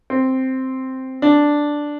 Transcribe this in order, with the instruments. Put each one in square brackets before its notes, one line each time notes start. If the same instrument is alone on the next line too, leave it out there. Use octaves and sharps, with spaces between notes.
[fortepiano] C4
D4